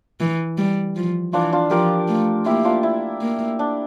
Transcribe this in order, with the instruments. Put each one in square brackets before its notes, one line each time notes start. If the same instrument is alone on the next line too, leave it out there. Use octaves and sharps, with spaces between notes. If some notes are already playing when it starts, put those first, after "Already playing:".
[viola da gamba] E3
G3
F3
[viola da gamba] E3 [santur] D4 F4
[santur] D4 F4
[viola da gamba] F3 [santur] G4 A#4
[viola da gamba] A3
[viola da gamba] A#3 [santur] E4 G4
[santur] D4 F4
E4
[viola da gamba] A#3
[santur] D4